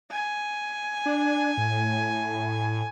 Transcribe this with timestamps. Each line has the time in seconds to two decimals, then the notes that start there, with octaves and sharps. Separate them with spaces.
0.10 G#5
1.06 D4
1.58 A2